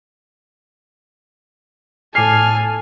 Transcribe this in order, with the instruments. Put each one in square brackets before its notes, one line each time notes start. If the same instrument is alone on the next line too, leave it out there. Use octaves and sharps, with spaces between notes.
[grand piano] A2 D6 C7 [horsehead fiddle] A4 [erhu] G#5 [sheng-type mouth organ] F6